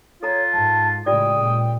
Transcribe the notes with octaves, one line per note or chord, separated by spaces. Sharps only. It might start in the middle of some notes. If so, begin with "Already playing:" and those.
F4 A4 C#5 A#5
G#2 A5
A2 C#3 G#3 F4 G4 D5 G5 D#6
A#2